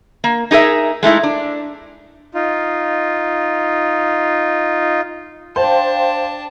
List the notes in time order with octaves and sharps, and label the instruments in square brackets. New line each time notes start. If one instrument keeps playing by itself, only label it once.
[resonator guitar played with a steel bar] A#3
D#4 G#4 A#4 E5
G#3 A3 D#4 E4
D4
[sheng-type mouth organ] D#4 F4
[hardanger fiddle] D4 A5 [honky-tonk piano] C5 [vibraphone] F5 G5